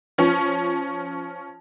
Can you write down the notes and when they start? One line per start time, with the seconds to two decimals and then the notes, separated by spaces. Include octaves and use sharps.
0.18 F3 C#4